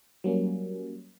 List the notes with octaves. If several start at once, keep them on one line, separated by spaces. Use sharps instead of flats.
F#3 G3 A#3 C#4